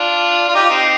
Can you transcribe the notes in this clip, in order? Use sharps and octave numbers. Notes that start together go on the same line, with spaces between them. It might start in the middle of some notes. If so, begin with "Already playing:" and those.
Already playing: D4 F4
F4
D#4 G4
F4
C4 D#4